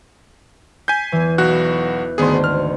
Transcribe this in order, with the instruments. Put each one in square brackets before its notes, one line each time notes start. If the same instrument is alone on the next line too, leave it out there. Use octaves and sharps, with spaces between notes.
[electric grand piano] G#5 G6 [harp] B6 C7
[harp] E2 E3
[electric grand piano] B1 F#4 F#6
[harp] G#1 D2 C6 [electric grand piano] B3 G#4
[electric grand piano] F6